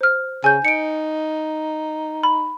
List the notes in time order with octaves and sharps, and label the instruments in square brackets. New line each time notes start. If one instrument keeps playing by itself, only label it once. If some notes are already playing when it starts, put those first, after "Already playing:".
[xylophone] C5 F6
[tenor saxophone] C#3 [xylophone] G#5 G6
[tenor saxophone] D#4 [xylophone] C#7 D7
[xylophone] B5